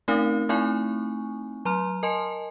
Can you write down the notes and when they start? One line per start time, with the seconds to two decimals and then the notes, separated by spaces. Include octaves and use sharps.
0.08 A3 C4 C#4 D#4 A#4 F5
0.49 A3 C4 D#4 E4 G#5 C#6
1.65 F#3 A#5 C6 F6
2.03 A#4 D#5 G#5 A5 C6